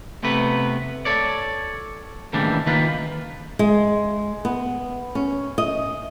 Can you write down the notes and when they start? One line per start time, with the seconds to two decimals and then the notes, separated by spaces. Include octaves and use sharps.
0.23 C3 A3 B3 B4
1.05 A4 C#5 D5
2.33 D#2 A2 C#3 E3 G3 D4
2.67 D#3 A#3 F4 B4
3.59 G#3
4.45 B3
5.15 C#4
5.58 D#5